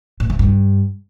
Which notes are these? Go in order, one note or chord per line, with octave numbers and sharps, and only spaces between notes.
A#2
C3
G2